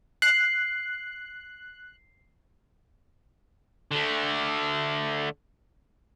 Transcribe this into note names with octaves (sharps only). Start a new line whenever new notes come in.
F#6 C7
D3 A3